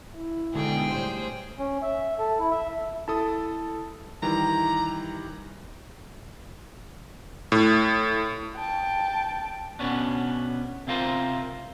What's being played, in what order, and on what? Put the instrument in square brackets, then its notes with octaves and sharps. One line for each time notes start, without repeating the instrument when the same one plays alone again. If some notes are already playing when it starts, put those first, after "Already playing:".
[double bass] E4
[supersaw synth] G#2 B2 D3 [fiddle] G#4 G5
[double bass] A2 G3 [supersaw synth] C5
[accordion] C#4
E5
A4
E4
E5
[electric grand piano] E4 A4 D#6 [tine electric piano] A5
[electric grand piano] D#3 E3 G4 [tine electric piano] G3 [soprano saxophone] A#5
[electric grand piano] A2
[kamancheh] G5 A5
[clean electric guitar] B2 B3 C#4 D4
C3 C4 F4 F#4 A#4 C5